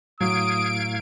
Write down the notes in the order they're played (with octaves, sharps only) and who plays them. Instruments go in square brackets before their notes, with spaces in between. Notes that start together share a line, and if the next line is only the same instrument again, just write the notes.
[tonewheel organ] A2 F5 G#6 [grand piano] F#3 [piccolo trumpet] D#6 [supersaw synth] D7